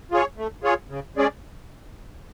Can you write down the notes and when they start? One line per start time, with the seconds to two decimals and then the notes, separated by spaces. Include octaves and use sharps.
0.11 F4 G#4 C#5
0.37 A3
0.64 F4 G#4 C#5
0.90 C#3
1.17 G#3 C#4 G#4 D5